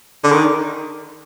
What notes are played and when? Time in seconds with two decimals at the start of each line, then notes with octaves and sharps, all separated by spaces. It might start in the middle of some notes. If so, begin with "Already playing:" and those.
0.24 D3
0.32 D#3